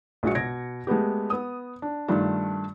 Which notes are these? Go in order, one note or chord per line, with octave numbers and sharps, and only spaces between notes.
A#1 G#3 F#4 C#7
B2 G#6 A#6 D7
G#3 A3 B3 G4
B3 D#6
D4
G2 D#3 G3 A3 D4 F4